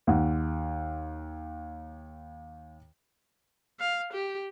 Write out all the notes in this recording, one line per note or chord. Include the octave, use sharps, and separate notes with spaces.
D#2 F#5
F5
G4